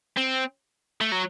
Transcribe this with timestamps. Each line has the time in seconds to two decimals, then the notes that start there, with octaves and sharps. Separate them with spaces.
0.17 C4
1.01 A3
1.12 F#3